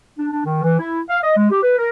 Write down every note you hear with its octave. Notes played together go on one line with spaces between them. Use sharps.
D4
D4
D#3
E3
E4
F5
D#5
G#3
G4
B4
A#4